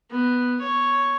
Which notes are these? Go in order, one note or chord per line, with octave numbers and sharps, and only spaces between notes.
B3
C#5